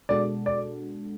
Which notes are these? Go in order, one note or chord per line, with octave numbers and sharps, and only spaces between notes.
B2 G#3 D4 F#4 A4 D5
D5